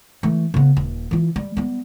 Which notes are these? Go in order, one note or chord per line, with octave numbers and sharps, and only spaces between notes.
E3 A3
C#3 B3
D#1
E3 F4
G3
G3 B3